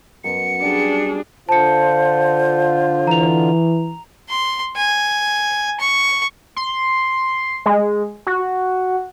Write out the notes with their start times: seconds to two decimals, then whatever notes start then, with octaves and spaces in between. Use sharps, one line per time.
0.24 F#2 B2 C#7
0.62 G3 D4 G#4
1.49 D3 F4 C5 A5 C#7
3.07 E3 A#5 F7
4.29 C6
4.76 G#5
5.80 C#6
6.56 C6
7.66 G#3
8.27 F#4